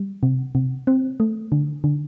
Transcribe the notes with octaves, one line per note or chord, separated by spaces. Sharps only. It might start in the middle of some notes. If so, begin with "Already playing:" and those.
Already playing: G3
C3
C3
C4
A3
D3
D3